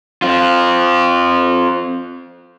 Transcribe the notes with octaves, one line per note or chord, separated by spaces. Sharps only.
C4 F4